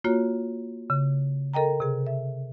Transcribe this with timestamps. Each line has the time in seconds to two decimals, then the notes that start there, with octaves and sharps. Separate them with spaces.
0.04 A#3 F4 F#4 C#5
0.90 C#3
1.54 A4 A#4 D#5 G5 A#5
1.80 C3 G#4
2.07 E5